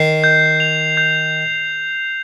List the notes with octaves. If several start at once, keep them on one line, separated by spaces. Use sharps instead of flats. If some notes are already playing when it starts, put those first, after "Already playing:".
Already playing: D#3 C7
G6
F7
G6